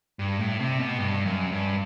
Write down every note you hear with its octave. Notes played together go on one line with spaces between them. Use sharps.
G2
A2
C3
B2
G2
F#2
G2